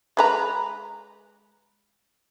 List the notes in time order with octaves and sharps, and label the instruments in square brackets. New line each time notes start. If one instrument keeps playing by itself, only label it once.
[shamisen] G#3 B4 A#5